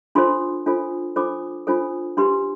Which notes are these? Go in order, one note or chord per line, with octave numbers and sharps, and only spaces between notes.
D4 F4 A4 C5 C6
D4 F4 A4 C5
D4 F4 A4 C5 D6
D4 F4 A4 C5
D4 G4 B4 C6